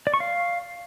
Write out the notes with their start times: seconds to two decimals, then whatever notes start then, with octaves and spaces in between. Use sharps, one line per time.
0.07 D5
0.14 C#6
0.20 F5